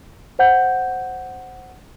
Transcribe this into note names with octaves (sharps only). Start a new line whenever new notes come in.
C5 F#5 G6